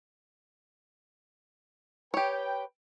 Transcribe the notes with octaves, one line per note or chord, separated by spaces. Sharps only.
G4 B4 C#5 G5